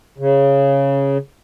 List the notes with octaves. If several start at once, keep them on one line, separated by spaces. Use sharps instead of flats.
C#3